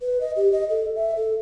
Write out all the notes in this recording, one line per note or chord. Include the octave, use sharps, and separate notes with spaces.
B4
D#5
G4
D#5
A4
E5
A4